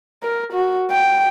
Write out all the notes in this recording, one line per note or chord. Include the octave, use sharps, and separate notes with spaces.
A#4
F#4
G5